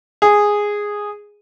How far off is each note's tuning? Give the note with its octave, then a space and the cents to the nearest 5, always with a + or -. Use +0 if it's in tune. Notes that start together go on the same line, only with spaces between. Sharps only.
G#4 -5